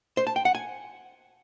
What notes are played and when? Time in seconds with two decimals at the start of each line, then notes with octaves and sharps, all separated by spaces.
0.17 C5
0.27 A5
0.36 G5
0.45 F#5
0.55 G#5